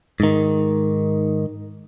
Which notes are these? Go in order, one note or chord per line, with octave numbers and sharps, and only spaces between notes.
G#2 D#3